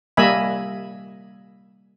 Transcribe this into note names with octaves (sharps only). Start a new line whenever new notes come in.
G3 A#3 D#5 E5 G#5 B5